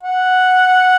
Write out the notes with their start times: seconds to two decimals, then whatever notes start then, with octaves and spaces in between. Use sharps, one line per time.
0.03 F#5